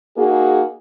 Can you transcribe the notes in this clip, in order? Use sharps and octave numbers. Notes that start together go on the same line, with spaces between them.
A#3 D#4 F#4 G#4